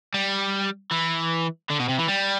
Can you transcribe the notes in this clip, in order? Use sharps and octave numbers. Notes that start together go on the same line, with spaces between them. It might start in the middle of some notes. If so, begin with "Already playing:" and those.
G3
E3
D3
B2
C3
E3
G3